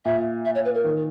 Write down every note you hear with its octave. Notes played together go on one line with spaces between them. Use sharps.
A#2 E5
E5
C#5
B4
A#4
D#3